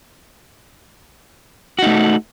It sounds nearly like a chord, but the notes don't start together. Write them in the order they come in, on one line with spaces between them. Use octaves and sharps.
F#4 D#4 A3